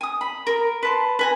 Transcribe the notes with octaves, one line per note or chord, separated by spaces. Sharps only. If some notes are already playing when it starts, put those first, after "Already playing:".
G#5 D#6
B5
A#4
B4 A5 C6
B4 G#5 A#5